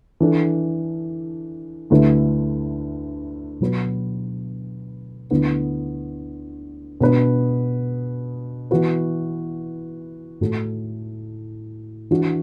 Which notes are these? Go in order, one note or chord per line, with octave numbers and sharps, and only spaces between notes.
E3 D4 A4
D2 D3 A3 E4 B4
B2 F#3 B3 F#4 B4
D2 D3 B3 E4
B2 B3 D4 B4
E3 B3 F#4 B4
A2 A3 F#4 A4
E3 D4 F#4